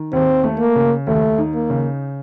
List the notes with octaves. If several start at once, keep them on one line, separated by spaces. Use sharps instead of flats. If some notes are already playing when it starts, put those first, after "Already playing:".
Already playing: D#3
D#2 C4
A3
A#3
C#3
D#2 A3
D#4
A#3
C#3